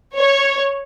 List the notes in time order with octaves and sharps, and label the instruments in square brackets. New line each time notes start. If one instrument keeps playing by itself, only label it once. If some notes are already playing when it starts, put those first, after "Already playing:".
[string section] C#5